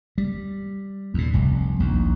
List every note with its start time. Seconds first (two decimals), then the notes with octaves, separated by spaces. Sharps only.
0.18 G3
1.14 D#2 A#2
1.34 F1 C2
1.80 A#1 D#2